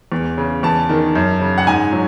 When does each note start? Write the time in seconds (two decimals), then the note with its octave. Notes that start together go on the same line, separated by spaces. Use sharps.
0.12 E2
0.38 C#3
0.63 E2 A5
0.89 D#3
1.15 F#2
1.41 C#3
1.58 F#5
1.67 G#2 G#5
1.92 F#3